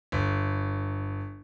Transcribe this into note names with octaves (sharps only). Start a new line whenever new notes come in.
G1